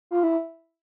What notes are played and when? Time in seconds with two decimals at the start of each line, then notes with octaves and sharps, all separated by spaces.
0.11 F4
0.23 E4